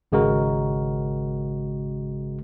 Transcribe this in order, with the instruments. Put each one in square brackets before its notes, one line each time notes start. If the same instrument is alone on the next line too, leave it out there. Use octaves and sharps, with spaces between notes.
[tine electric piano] G#1 C#3 G#3 F#4 A#4